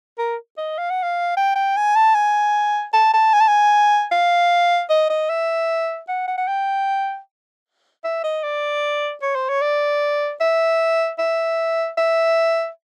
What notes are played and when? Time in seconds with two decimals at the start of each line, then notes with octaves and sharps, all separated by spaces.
0.18 A#4
0.58 D#5
0.78 F5
0.90 F#5
1.03 F5
1.37 G5
1.56 G5
1.76 G#5
1.96 A5
2.15 G#5
2.93 A5
3.14 A5
3.33 G#5
3.40 A5
3.48 G#5
4.12 F5
4.90 D#5
5.10 D#5
5.30 E5
6.08 F#5
6.28 F#5
6.38 F#5
6.48 G5
8.04 E5
8.24 D#5
8.43 D5
9.22 C#5
9.35 C5
9.49 C#5
9.62 D5
10.41 E5
11.19 E5
11.98 E5